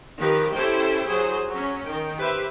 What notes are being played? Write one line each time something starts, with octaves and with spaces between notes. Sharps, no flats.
D#3 F3 G4 A#4 B4
C#4 E4 G4 A4 C5 G5
F#3 G#4 C5
F#3 C#4
D#3 G5
G4 B4 C5 E5